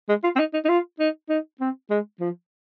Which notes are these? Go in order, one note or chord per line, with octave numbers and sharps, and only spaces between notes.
G#3
F4
C4
D#4
D#4
D#4
F4
D#4
D#4
C4
G#3
F3